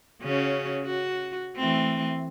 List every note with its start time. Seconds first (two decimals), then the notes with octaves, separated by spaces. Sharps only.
0.22 C#3 C#4 F#4
0.85 F#4
1.56 E3 A3 C4